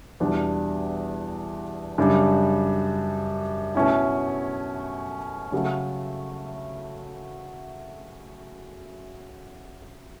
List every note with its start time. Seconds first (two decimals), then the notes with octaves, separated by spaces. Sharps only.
0.20 E2 B2 G3 D4
1.98 F#2 C#3 G3 D4
3.75 B2 A3 C#4 E4
5.52 C#3 F#3 A3